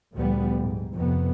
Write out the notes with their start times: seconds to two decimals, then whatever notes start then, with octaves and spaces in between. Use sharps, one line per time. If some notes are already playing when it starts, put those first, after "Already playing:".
0.15 D2 A#2 F3 G3 B3
0.59 G#2
0.95 F2 C3 B3